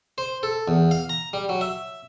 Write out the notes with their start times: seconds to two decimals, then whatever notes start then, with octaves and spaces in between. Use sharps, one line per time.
0.18 C5
0.43 A4
0.68 E2
0.91 F5
1.09 A#5
1.33 G3
1.49 F#3
1.61 E5